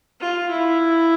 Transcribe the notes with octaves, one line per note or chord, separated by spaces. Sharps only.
F4
E4